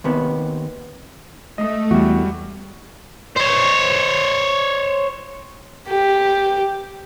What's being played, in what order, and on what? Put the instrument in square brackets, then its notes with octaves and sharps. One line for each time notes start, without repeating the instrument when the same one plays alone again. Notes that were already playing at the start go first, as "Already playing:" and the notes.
[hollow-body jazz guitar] D#2 C3 B3
[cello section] A3 [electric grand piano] D#5 D#6
[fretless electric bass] E2 [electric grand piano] G3 F#4
[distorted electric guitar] C5 C#5
[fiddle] G4